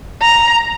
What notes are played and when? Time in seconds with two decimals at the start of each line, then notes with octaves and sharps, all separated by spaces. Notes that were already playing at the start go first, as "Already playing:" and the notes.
0.22 A#5